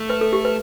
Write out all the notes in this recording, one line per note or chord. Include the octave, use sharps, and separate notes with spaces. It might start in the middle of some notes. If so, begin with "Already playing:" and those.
Already playing: A3
B4
A4
G4
B4